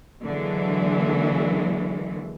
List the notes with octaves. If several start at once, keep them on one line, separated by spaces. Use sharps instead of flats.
D3 E3 F#3 G#3 A#3